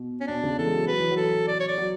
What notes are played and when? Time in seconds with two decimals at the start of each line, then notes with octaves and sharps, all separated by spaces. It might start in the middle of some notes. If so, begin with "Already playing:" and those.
Already playing: B2
0.21 C#4
0.27 B2 D4
0.43 C#3
0.58 E3 A4
0.66 G#3
0.73 F#3
0.87 F#3 B4
0.99 E3
1.11 F#3
1.17 A4
1.48 D5
1.60 C#5
1.68 D5
1.78 F#3